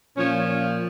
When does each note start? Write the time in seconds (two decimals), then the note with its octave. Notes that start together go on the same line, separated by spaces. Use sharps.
0.16 A#2 F3 C#4 C#5